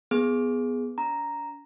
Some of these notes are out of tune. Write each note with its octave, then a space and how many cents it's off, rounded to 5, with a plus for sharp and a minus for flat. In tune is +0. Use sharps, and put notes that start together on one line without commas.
B3 +0 G#4 +0
D4 -45 A#5 +0